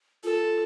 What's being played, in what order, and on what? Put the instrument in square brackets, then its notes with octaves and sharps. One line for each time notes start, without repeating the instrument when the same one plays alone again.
[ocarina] F4 [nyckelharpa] A4